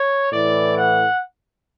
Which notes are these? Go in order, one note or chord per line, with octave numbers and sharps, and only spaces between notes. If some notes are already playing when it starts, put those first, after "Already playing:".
Already playing: C#5
A2 E3 D5
F#5